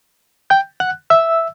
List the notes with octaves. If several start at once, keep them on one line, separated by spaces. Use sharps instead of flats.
G5 G6
F#5 F#6
E5 E6